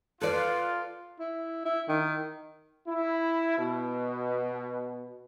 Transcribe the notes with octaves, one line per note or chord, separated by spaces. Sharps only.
F4 A4 B4 D5
E4
E4
D#3
E4
B2